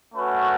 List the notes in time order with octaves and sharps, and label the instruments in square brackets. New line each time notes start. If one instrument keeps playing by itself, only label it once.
[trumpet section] A3 C#4 F#4 B4